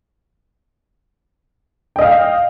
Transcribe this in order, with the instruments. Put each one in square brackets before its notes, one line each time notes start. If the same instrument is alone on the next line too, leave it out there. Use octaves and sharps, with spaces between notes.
[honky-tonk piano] G5
D#5
F5